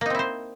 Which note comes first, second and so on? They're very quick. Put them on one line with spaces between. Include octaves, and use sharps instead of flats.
A#3 D#4 C4 E4 C5